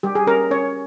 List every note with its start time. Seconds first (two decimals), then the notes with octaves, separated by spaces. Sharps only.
0.03 G3 G4
0.15 G#4
0.27 C#4 A#4
0.51 C#4 C#5